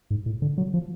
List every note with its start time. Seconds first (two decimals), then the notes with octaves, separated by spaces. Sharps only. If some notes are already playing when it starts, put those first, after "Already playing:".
0.11 G#2
0.26 A2
0.42 D3
0.58 F#3
0.74 F3